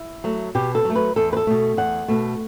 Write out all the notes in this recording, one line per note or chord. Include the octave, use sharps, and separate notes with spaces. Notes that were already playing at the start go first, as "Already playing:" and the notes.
Already playing: E4
F#3 A3
B2 G4
A4
F#3 A3
B4
E2 A4
B4
A4
B2 A3
E2 F#5
B2 A3